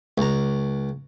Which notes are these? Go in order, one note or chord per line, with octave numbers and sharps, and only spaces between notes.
C#2 A#5